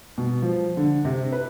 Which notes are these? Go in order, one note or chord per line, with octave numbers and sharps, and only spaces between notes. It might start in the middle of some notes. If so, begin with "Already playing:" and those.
B2
F3
D3
C3
B4